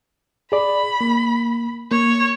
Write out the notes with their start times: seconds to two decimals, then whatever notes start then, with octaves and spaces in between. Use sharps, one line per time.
0.52 G#4 D5 B5
1.01 A#3
1.91 A#3 C#5